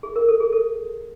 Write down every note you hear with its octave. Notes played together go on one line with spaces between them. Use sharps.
G#4
A#4
A4
G#4
A4